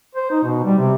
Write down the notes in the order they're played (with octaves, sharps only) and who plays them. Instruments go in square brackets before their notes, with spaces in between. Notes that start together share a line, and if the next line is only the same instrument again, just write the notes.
[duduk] C5
D#4
B2
G3
C3